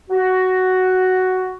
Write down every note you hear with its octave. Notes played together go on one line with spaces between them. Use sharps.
F#4